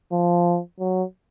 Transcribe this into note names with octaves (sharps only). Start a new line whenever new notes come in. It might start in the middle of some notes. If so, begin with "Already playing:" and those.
F3
F#3